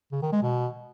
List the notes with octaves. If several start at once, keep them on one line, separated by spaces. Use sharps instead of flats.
C#3
D#3
G#3
B2